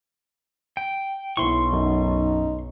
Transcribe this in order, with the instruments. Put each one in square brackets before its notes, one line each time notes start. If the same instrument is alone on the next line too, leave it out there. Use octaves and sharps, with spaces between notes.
[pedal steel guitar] G5
[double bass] B1 [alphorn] E4 [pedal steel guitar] C6 C#6
[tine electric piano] F#2 [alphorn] D#4